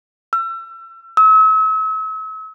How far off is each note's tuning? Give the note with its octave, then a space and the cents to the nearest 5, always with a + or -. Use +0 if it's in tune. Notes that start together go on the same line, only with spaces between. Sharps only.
E6 +35
E6 -40